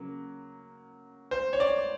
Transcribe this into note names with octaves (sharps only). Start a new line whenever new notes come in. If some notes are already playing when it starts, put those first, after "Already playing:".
Already playing: C#3 F#3 A#3
C5
C#5
D5